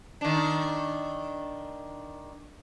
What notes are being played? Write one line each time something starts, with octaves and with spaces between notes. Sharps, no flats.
D#3 D4